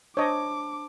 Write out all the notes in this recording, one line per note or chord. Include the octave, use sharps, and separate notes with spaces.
D4 C5 C#5 D#5 A5 D6